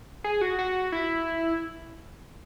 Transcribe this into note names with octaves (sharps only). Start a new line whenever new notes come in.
G#4
F#4
F#4
E4